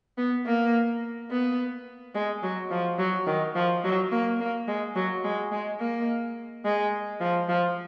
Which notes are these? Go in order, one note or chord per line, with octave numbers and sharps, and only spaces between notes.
B3
A#3
B3
G#3
F#3
F3
F#3
D#3
F3
F#3
A#3
A#3
G#3
F#3
G#3
G#3
A#3
G#3
F3
F3